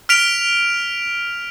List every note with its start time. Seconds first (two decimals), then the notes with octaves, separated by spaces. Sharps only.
0.09 F6 B6 D7 F7